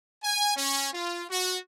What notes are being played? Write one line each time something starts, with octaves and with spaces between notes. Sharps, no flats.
G#5
C#4
F4
F#4